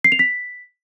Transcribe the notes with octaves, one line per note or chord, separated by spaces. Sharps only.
C7
F7
B6